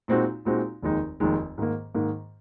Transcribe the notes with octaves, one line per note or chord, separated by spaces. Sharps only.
A#2 G#3 C4 D#4 F#4
A#2 G#3 C4 D#4 F#4
F1 D#2 D#3 G#3 D#4
F1 D#2 D#3 G#3 D#4
G#2 D#3 A#3
G#2 D#3 A#3